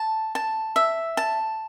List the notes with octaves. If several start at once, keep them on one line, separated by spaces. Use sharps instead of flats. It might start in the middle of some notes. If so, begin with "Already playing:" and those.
Already playing: A5
A5
E5
A5